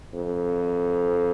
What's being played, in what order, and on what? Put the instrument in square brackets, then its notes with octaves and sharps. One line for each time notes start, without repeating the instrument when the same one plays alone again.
[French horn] F2